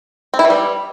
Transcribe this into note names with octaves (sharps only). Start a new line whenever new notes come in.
C4
E4
E3
G3